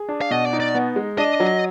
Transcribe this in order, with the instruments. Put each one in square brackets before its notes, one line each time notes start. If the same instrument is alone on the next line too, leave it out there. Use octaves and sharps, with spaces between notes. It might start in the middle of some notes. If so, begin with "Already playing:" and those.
Already playing: [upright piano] G#4
D4
[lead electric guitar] F5
[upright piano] B2 [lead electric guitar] D#5
[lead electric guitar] D5
[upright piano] D#4
[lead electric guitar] D5
[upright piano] B3
G#3
[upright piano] D4 [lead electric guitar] D#5
[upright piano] F#3